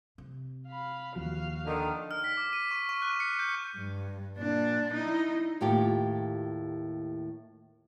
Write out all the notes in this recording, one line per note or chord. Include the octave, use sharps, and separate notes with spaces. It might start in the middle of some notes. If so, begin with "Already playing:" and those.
C3
F5 B5
D#2 F3 F#4 F5
D3 D#3
F6
B6
D6
D#7
C#6
C#6
F#6
C#7
G6
G2
A#2 D4
D#4 E4
D#2 A2 F4 G4